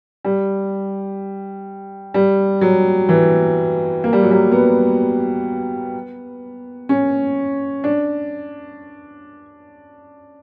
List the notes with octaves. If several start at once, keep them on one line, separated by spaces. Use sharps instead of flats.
G3
G3
F#3
E3
A#3
G3
F#3
G3
B3
C#4
D4